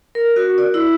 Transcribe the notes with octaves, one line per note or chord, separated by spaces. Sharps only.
A#4
F#4
D5
E4